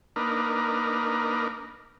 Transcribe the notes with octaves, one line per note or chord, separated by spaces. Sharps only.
A#3 D4 D#4 A#4 B4